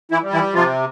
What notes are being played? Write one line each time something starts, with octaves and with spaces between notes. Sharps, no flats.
E3 E4
G3
E3 E4
C3 F3 F4